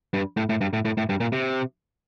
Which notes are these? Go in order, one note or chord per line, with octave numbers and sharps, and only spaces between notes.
G2
A2
A2
G2
A2
A2
A2
G2
A#2
C3